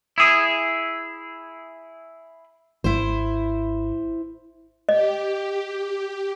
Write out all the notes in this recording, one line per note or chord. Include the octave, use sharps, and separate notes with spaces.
E4 G#4
G#1 E4 C5
G4 D#5